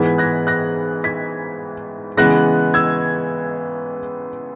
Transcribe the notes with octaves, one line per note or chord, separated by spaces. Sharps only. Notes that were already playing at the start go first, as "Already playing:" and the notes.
Already playing: G#2 E3 B3 G#6 B6
F#6 A#6
F#6 A#6
G#6 B6
C#3 E3 G#3 B3 F#6 A#6
E6 G#6